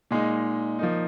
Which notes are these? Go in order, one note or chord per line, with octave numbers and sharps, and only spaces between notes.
A#2 G#3 D#4
F3 A#3 D#4